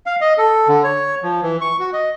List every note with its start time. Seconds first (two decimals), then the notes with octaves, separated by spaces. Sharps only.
0.06 F5
0.21 D#5
0.38 A4
0.68 D3
0.84 C#5
1.23 F3
1.43 E3
1.61 C#6
1.80 F#4
1.93 D#5